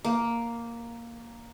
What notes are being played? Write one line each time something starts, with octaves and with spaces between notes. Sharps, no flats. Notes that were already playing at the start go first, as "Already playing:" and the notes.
A#3